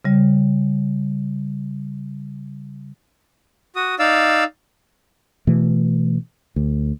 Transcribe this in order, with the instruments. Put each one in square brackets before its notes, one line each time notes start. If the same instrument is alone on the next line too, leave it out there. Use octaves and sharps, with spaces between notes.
[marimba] C#3 G3
[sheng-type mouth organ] F#4 D#6
D#4 D5 F5 E6
[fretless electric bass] B2 E3 A3
D2